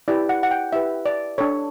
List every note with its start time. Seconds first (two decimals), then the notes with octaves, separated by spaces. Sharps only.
0.08 E4 G4 B4 D5
0.29 F#5
0.43 F#5
0.51 G5
0.73 E4 G4 B4 E5
1.06 D5
1.38 D4 A4 C#5